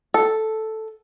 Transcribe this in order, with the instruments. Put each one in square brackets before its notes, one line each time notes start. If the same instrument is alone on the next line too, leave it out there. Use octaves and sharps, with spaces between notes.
[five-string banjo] A4